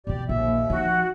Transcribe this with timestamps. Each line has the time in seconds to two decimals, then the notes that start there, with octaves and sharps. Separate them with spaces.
0.07 B2 E3 G4 D5
0.29 A#1 D#2 E5
0.70 F3 D#4 F#4